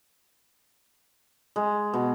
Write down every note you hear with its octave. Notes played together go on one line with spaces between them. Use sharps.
G#3
B2